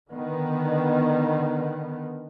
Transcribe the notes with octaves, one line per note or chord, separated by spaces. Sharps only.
D3 D#3 B3